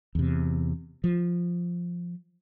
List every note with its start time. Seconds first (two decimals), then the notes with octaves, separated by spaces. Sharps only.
0.15 E2 C3
1.04 F3